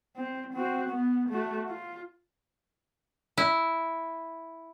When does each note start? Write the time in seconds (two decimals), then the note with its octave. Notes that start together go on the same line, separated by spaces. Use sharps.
0.17 C4
0.54 C4 F#4
0.90 B3
1.29 A3 F#4
1.69 F4
3.38 E4